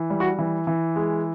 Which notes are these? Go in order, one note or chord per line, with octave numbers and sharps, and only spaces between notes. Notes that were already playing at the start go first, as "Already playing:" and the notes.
Already playing: E3
G3
F#4
E3
E3
G#3